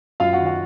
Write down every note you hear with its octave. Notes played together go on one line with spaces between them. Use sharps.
F#2 F4 F5
F#4 F#5
D#3
F#4 F#5